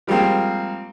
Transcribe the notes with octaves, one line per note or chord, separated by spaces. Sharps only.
F3 G3 G#3 A#3 C4